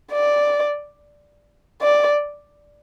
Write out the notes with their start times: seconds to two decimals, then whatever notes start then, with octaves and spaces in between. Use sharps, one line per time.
0.12 D5
1.82 D5